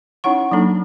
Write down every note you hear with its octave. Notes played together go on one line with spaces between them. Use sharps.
C#4 D#4 E4 C#5 F#5 C#6
F#3 A#3 D4 D#4 A4